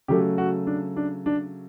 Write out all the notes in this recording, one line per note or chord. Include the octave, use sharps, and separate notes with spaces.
C#3 F#3 A3 G4
F#4
D4
D4
D4